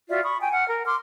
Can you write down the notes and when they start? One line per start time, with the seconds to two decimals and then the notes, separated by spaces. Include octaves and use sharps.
0.09 F4 F#4 D5 E5
0.23 B5 C#6 D#6
0.40 G5 G#5
0.53 F#5 F6
0.69 A#4
0.87 C6 D6 F6